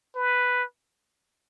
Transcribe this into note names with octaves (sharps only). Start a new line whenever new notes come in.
B4